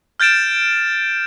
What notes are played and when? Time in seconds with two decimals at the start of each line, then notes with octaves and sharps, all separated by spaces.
0.20 F6 G6 A6 D7 E7